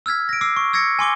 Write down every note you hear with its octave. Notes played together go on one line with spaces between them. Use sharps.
E6 F6 G#6 B6
A#6 D7
D6 E6 C7
C#6
E6 G#6 A#6 C#7
G#5 C6 D6 G7